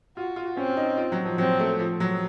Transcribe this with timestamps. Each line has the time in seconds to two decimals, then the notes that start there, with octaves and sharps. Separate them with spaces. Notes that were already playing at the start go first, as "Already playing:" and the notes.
0.17 F4 F#4
0.36 F4
0.57 C4 C#4
0.77 D#4
0.97 F4
1.12 F#3
1.25 F3
1.38 F#3 C4
1.59 A3
1.79 F3
2.00 F#3